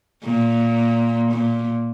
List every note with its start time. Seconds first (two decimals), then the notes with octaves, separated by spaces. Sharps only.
0.23 A#2
1.32 A#2